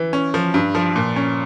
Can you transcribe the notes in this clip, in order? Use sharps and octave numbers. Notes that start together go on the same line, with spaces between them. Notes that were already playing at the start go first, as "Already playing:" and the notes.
Already playing: E3
C#4
F3
G2
F3
A#2
C#4